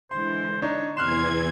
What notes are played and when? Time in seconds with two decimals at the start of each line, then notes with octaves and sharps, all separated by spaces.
0.11 D3 E3 G#3 C5 C6
0.62 D4 D#4 C#5
0.97 E2 C3 E3 C6 F6 F#6 G#6 E7